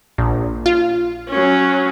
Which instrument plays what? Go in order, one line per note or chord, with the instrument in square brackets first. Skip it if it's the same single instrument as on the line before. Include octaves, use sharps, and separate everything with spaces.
[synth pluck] A#1
F4
[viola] F#3 C#4